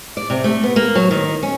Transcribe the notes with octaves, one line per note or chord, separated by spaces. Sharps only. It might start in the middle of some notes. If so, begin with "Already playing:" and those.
D5
C3
A3
B3
A#3
F#3
D#3
C#4